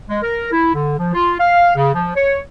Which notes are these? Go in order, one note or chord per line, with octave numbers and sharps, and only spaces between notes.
G#3
A#4
E4
D3
F3
F4
F5
C#3
F3
C#5